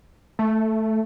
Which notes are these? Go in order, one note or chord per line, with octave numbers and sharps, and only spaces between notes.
A3